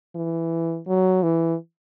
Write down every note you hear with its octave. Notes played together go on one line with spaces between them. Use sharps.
E3
F#3
E3